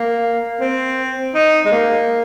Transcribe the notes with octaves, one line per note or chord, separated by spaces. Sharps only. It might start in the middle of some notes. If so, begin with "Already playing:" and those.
Already playing: A#3
C4
D#4
G#3
A#3